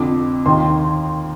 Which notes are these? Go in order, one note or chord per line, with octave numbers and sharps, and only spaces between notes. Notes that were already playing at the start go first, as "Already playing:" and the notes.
Already playing: F2 D3 D6
D#2 D#3 C6